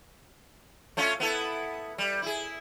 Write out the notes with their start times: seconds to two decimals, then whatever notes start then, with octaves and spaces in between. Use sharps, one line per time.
0.97 A3 C#4 F4
1.20 B3 E4 A4
1.98 G3
2.22 E4 G#4